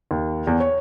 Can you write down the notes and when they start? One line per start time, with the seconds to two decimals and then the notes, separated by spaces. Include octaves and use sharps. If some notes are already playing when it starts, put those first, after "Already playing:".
0.11 D#2
0.47 E2
0.60 C#5